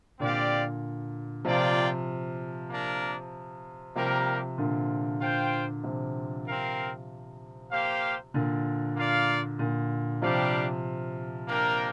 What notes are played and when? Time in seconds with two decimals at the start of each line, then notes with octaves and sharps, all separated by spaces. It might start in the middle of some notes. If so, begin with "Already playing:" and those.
0.19 A#2 D3 C4 G4 D5 F5
1.45 C3 F3 A#3 F4 D5 G5
2.70 A#3 D4 A#4
3.95 C3 F3 G3 A#3 G4 A#4
4.58 A#2 D3
5.21 F4 C5 G5
5.84 C3 F3
6.46 C4 A#4 F5
7.71 A#3 G4 C5 F5
8.34 A#2 D3
8.96 A#3 F4 D5 F5
9.59 A#2 D3
10.22 C3 F3 G3 D4 G4 D5 F5
11.47 A#3 D4 A#4 G5